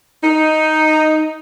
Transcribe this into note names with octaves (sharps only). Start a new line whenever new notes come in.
D#4